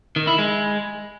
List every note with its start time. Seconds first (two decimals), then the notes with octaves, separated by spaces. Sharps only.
0.16 D#3
0.27 E4
0.38 G#3